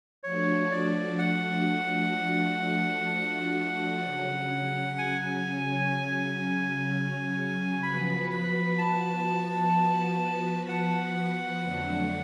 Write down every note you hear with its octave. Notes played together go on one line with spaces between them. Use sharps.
F3 A3 D4 F#4 C#5
D5
F#5
C#3 F#3 C#4
G#5
F3 B3 F#4 B4 B5
B5
A5
F#5
F2 D3 F#3 A3 D4